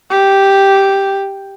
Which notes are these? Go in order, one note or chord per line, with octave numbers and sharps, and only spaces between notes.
G4